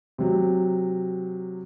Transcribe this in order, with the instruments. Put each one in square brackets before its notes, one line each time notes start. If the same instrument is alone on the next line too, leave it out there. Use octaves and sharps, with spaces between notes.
[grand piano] C3 F#3